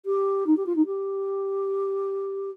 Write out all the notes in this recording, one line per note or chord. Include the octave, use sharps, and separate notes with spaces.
G4
D#4
G4
F4
D#4
G4